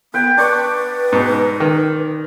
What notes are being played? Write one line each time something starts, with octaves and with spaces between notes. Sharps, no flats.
B3 B4 G5
D4 B4 D5 C#6
G#2 B2
D#3